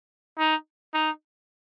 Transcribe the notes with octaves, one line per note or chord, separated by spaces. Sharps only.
D#4
D#4